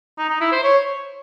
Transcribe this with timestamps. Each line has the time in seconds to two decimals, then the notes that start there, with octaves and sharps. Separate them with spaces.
0.18 D#4
0.29 D#4
0.41 E4
0.52 C5
0.63 C#5